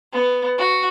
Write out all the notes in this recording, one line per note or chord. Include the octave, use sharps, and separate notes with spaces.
B3
F#4